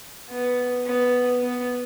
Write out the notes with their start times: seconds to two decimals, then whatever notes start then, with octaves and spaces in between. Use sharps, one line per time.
0.29 B3
0.86 B3
1.43 B3